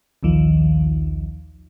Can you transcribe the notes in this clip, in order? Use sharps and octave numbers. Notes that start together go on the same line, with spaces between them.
A#1 D#2 D#3 F3